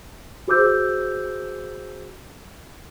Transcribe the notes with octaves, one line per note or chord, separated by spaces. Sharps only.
F#4 G#4 C5 D6 E6 G6